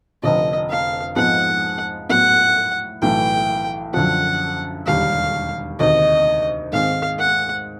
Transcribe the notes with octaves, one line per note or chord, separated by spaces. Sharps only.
F1 F2 D3 F3 D#5
F5
G#2 F3 G#3 B3 D#4 F#5
A2 F#3 B3 F#5
B1 A2 E3 A3 G5
F#2 D3 F3 F#5
E1 D#2 D3 G3 F5
D2 C3 D#3 D#5
G#2 D#3 G#3 C4 F5
F#5